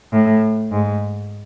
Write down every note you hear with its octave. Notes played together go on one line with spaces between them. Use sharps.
A2
G#2